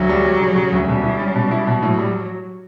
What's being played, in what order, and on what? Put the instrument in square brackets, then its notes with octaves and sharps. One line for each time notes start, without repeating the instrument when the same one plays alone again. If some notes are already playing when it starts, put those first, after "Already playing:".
Already playing: [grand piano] D2 [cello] F#3
[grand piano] G3
G3
C#3
C#3
D2
[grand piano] B2 [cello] G3
[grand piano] E4
C#4
B2
E4
B2
[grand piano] A2 [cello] F#3
[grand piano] G3